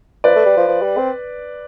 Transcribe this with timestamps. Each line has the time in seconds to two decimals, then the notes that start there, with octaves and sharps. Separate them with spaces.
0.24 F3 B4 D5
0.36 A3
0.46 G3
0.57 F3
0.68 F3
0.82 G3
0.97 C4